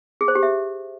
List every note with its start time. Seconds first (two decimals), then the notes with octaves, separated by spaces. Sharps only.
0.21 G#4
0.28 C5
0.35 G4
0.43 E5